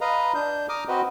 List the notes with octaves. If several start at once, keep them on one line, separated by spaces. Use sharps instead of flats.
B4 D#5 F5 A#5
D4 G6
A#5 D6 D#6 F6
C4 F#4 B4 D#5